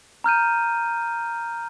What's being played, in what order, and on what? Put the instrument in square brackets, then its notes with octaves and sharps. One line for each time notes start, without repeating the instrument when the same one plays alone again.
[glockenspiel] A#5 F6 G6 D#7